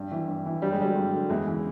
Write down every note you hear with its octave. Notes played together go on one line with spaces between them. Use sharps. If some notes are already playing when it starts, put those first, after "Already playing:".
Already playing: G2
E3
G2
E3
G2 G3
G#3
D3 F#3 G3
G2
D3 F#3
E2 G#3
C#3 E3